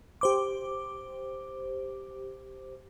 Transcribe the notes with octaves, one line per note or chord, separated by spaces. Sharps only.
G4 C5 D6